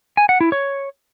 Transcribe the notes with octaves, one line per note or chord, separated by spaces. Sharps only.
G#5
F#5
E4
C#5